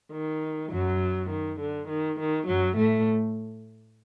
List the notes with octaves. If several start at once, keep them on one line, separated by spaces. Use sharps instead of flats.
D#3
F#2 F#3
D#3
D3
D#3
D#3
F#2 F#3
A2 A3